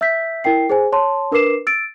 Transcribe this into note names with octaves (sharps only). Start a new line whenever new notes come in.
E5 E6 G6 B6
E4 A#4 G5 C7
G#4 C5 G#5
C#5 A5 C6
D4 A#4 B4 D6 C7 E7
E6 A6 D7